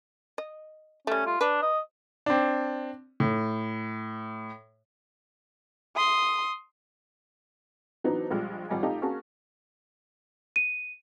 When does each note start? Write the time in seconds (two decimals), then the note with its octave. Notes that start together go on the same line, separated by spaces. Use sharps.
0.38 D#5
1.07 G3 A3 C#4
1.26 F4
1.41 D4 B4
1.63 D#5
2.26 C4 D4
3.20 A2
5.96 C6 D#6
8.04 E3 F#3 B3 C4 D4 D#4
8.31 A#1 F3 G3 G#3
8.69 G#1 F3 G3 D#5 G#5
8.83 A3 D#4 F4 G4 D#5 A5
9.02 A#3 C#4 F#4 G#4 A5
10.56 D#7